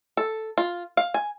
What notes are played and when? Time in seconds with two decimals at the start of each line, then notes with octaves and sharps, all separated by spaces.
0.17 A4
0.58 F4
0.97 F5
1.14 G#5